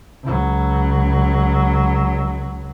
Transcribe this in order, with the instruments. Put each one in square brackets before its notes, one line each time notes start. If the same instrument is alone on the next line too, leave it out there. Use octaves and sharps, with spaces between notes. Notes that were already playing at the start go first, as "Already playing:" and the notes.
[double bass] C#2 F#3